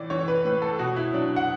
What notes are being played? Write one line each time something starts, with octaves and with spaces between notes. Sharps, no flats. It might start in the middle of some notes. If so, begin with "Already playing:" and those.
Already playing: A2 E3 D5
E3 C#5
B4
A2 B4
A4
B2 F#4
E4
F#3 D4
F#5